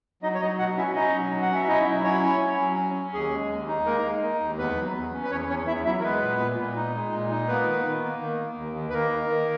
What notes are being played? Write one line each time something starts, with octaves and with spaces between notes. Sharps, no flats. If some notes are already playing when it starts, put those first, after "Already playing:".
F#3 D#4 D#5
C#5
F#3 D#4 D#5
B2 F#4 F#5
C#4 E4 E5
C#4 D#4 D#5
F#3
B2
F#5
C#4 E5
D#4 E4 D#5
F#3
C#4 E4 C#5
C#4
C#4
F#3
C#4
C#4
D#2 G#4
G#3
D#2
D#4
G#3 A#3 A#4
G#3
D#4
D#2
E2 B3 B4
F#3
E2
C#4
B4
E2 C#4 C#5
E2 C#4 C#5
E2 E4 E5
F#3 E4 E5
A#4
G#3 B3 B4
A#2
A#2
A#2
D#4
G#3
A#2
D#4
A#3 B3 B4
D#3
D#3
A#3
D#3
A#3
D#2
D#3
B4
D#3 A#3 A#4
D#3
D#3